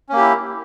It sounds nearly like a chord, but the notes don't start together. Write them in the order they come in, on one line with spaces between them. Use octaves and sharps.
C#4 A#3 G4 E4